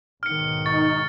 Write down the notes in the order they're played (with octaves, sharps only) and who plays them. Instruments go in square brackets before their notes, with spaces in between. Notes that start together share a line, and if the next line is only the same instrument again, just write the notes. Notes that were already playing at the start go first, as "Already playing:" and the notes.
[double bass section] B1 G#2 D#3 [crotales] F6 C#7
[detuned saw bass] D#4 [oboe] C#6 [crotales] A6